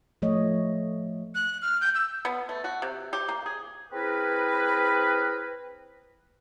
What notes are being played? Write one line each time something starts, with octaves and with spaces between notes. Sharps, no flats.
F3 A3 C#5 D#5
F#6
F6
G6
E6
B3
A3
F#4
C3
G4
A#3
G#4
C4 E4 G#4 A#4 B4